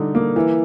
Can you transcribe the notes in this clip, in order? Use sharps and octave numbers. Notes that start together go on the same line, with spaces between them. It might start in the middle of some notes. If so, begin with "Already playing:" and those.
Already playing: D3 G3 D#4
A#3
E3